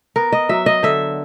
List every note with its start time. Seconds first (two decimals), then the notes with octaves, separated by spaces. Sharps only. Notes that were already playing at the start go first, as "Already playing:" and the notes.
0.16 B3 A#4
0.32 D#5
0.49 F#3 E5
0.66 D#5
0.83 D3 E5